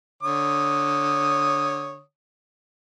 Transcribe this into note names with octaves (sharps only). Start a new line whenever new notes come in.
D3 C#5 D#6